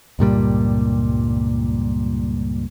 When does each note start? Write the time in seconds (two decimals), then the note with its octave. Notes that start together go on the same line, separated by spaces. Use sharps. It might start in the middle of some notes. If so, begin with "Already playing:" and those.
0.19 C#2 G2 A#2 G3